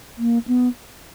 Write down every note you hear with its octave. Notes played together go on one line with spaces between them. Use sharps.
A#3
B3